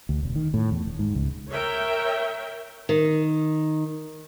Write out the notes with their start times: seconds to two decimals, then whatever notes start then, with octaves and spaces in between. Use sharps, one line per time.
0.09 D2
0.23 E1
0.36 D#3
0.54 A2
0.71 E2
0.85 D#1
0.99 G#2
1.15 C#2
1.51 A#4 C#5 E5 G5
2.89 D#3